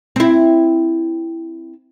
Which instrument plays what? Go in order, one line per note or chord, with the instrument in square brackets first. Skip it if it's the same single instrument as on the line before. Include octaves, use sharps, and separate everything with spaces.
[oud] C4 E4